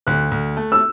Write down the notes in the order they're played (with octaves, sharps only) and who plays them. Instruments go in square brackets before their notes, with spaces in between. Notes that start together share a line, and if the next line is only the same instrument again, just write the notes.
[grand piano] D2 [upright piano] F#6
[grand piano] D2
A3
[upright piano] E6